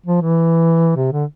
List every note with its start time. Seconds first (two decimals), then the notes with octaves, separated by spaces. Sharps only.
0.06 F3
0.22 E3
0.96 C3
1.12 D3